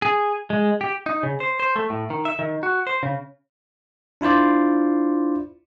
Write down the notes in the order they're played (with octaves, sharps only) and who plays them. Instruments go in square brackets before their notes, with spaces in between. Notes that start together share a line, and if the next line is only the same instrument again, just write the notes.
[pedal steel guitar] G#4
G#3
G4
[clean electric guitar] D#4
C#3
C5
C5
A3
A2
D#3
E5
D#3
F#4
C5
C#3
[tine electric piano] D4 E4 F4 C5 D5